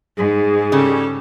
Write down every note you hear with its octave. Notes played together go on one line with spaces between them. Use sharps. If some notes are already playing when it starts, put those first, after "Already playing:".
G#2 G#4
C#3 G3 C#4 A4